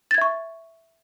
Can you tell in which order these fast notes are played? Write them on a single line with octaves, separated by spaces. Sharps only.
A6 G#6 E5 C#6